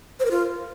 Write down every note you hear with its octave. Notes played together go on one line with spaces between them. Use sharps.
C5
A#4
F4